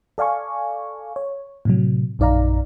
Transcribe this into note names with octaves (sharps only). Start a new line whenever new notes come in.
A4 D5 F5 G#5 C#6
C#5
A2 C3 F#3
A#1 F#2 D#4 D5 F5 A#5